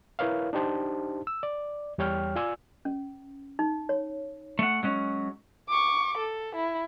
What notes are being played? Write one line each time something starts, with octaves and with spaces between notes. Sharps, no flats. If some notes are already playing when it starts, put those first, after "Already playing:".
E4 A#4 B4 C#5 F5
D4 D#4 G4 C5 A5
E6
D5
E2 G3 C#5 G5 F6
F4 D5 G#5 E6
C#4
D#4
C#5
A3 F#5
F#3 G#3 C#4
C#6 D6
A4
E4